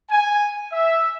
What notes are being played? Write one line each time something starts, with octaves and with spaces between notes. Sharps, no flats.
G#5
E5